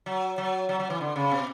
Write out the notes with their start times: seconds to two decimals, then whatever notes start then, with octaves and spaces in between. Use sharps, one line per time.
0.06 F#3
0.38 F#3
0.69 F#3
0.80 F#3
0.90 E3
1.01 D3
1.16 C#3
1.32 B2